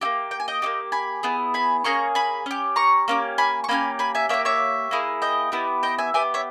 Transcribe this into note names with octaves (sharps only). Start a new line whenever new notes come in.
A#3 E4 G4
G5
G#5
D#5 G5
A#3 D#4 G4
G#5 B5
B3 E4 G#4
G#5 B5
A#3 C#4 G#4 A#5 C#6
G#5 B5
C#4 G4
A#5 C#6
A#3 C#4 G4
G#5 B5
C#6
A#3 C#4 G4 G#5 B5
G#5 B5
E5 G#5
A#3 E4 G4 C#5 E5
C#5 E5
A#3 E4 G#4
D#5 G5
B3 E4 G4
D#5 G5
E5 G#5
B3 G4 E5 G#5
C#5 E5